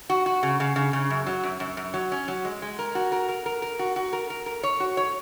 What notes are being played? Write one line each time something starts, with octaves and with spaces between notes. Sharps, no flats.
F#4
F#4
C#3
C#3
C#3
C#3
F#2
F#3
F#2
F#2
F#2
F#3
C#4
F#3
G#3
G#3
A#4
F#4
A#4
A#4
A#4
A#4
F#4
F#4
A#4
A#4
A#4
C#5
F#4
C#5